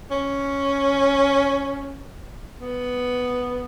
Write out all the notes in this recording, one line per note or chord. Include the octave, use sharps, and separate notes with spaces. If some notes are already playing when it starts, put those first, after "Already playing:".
C#4
B3